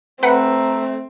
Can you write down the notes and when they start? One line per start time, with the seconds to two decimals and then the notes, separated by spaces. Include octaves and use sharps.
0.23 A3 C4 B4 F#5 A#5